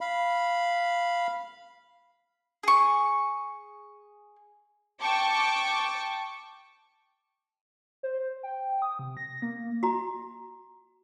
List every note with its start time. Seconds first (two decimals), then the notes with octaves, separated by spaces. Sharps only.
0.01 F5 B5
2.63 G#4 C#6
5.01 G5 A5 C#6 D6
8.03 C5
8.43 G5
8.82 D#6
8.99 C3
9.17 A#6
9.42 A#3
9.83 F#4 A#5